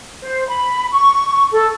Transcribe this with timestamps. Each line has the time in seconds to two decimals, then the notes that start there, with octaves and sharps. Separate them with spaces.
0.22 C5
0.48 B5
0.93 C#6
1.52 A4